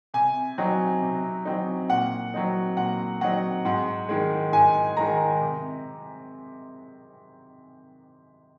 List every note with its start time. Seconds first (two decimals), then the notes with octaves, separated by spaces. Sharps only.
0.14 C3 G#5
0.58 F#3 C4 D#4
1.02 C3
1.45 F#3 C4 D#4
1.90 A#2 F#5
2.34 F#3 C4 D#4
2.77 A#2 F#5
3.21 F#3 C4 D#4 F#5
3.65 G#2 F#5
4.09 D#3 G#3
4.52 G#2 G#5
4.97 D#3 G#3 A#5
5.41 C3